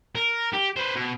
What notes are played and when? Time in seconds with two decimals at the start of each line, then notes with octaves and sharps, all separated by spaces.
0.15 A#4
0.53 G4
0.76 B4 C5
0.96 B2